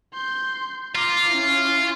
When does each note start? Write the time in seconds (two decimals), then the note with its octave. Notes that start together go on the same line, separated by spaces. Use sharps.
0.14 C6 G6
0.95 F4 A#5 D6
1.29 C#4 E4